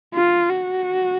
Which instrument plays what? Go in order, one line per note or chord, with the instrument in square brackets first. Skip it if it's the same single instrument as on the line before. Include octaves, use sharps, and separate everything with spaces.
[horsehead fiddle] F4
F#4